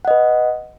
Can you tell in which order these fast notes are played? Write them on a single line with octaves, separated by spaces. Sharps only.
F#5 D#5 B4